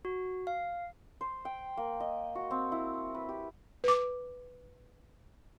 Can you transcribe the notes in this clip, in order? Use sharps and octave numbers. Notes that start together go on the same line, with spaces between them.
F#4
F5
C5
G5
A#3
D#5
F#4
C4
E4
B4
G4
B4 D6